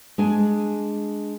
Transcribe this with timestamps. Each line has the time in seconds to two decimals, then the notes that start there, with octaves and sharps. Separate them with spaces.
0.18 G#3 D4 G#5